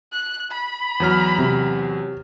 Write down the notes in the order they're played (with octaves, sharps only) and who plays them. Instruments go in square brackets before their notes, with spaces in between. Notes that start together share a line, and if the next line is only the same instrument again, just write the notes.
[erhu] F#6
B5
[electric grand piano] E2 F#3 F6
[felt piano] C3